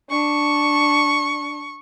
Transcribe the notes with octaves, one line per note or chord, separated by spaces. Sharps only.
D4 C#6